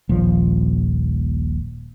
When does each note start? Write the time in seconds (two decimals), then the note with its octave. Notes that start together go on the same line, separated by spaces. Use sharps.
0.09 D#1 A#1 F3